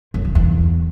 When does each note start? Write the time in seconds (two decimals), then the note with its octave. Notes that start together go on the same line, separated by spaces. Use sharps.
0.14 F#2
0.25 D3
0.35 E2